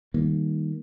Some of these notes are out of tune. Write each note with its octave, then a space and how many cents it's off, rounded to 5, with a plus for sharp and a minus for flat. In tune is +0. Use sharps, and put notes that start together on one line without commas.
D#3 +0 G3 +0 A#3 +0